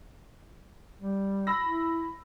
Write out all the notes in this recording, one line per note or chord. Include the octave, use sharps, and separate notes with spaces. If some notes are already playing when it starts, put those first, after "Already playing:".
G3
B5 E6 A#6
E4